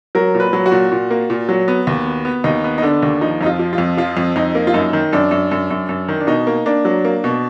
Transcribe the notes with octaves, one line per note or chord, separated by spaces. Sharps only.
F#3 A#4
A#2
B4
F#3
F#4
A#2
A#2
A#3
A#2
F#3
B3
D#2
B3
B3
D#2 D#4
B3
D#4
D3 D4
D#2
F3 D#4
F2 D#4
F4
F3
F4
F2
F3 F4
F2
F2 D#4
A#3
F4
F#2 D#4
D#3
F#2 D4
F#2
F#2
F#2
F#2
D#3
D4
B2 D#4
A#3
A#3 D4
F#3
A#3
B2